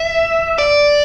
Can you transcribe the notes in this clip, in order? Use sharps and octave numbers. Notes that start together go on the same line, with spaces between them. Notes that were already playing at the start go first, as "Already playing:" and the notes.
Already playing: E5
D5